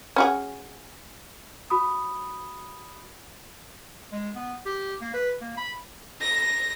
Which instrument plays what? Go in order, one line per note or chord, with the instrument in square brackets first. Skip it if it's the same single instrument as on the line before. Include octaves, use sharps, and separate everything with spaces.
[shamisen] C#4 F#4 G#4
[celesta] F#4 B5 D#6
[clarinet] G#3
B3
G4
A#3
B4
A#3
B5
[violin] A#6